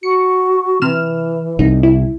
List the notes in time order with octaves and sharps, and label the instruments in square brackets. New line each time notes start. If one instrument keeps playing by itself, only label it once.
[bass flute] F#4 [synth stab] C#7
[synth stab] C3 F6 E7 [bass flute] E3
[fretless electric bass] C2 [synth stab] D#4
[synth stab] E4